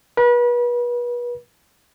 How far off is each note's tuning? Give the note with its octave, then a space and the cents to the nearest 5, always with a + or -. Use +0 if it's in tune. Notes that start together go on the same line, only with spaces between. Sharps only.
B4 -35